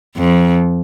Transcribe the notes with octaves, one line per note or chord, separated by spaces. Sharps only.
F2